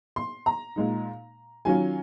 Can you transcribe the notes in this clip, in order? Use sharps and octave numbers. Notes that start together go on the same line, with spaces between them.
C6
A#5
A#2 G#3 D#4
D#3 F#3 C#4 F4 G#5